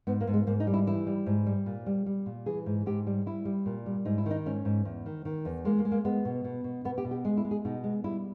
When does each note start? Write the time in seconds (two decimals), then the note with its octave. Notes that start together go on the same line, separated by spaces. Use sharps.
0.07 G#2 B3
0.21 A#3
0.27 G#2
0.34 G#3
0.47 G#2 A#3
0.60 D#4
0.67 G3
0.73 E4
0.87 E3 E4
1.07 G3
1.26 G#2
1.46 G3
1.66 A#2
1.86 G3
2.06 G3
2.26 A#2
2.46 E3 G#4
2.66 G#2
2.86 G#2 G4
3.07 G3
3.26 G3 E4
3.45 G3
3.66 A#2
3.86 G3
4.05 G#2 D#4
4.18 E4
4.26 D#3 D#4
4.46 G#2 C#4
4.65 G#2
4.85 E2
5.06 D#3
5.25 D#3
5.45 E2
5.65 G#3 A#3
5.79 A#3
5.85 G#3
5.92 A#3
6.05 G#3 B3
6.25 B2
6.44 B2
6.64 B2
6.85 B2 B3
6.98 G4
7.05 B2
7.11 G4
7.25 G#3 G#4
7.37 E4
7.45 G#3
7.51 G#4
7.65 B2 D#4
7.84 G#3
8.04 G3 E4